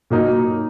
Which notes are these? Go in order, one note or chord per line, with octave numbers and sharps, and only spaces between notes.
A#2 F#3 A#3 D#4